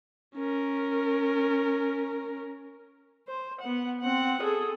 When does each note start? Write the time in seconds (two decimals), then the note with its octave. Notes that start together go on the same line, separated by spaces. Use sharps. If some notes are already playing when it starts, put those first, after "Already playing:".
0.36 C#4 A#4
3.27 C5
3.61 B3 F#5
4.01 C4 F#5
4.41 G#4 A4